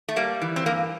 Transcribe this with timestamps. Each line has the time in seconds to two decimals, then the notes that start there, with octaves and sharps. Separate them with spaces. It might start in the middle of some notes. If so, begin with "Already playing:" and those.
0.09 A3
0.16 G3 A#3
0.42 E3
0.56 C4
0.66 G2 A#3